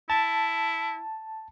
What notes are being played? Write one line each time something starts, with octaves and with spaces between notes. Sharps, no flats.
E4 A5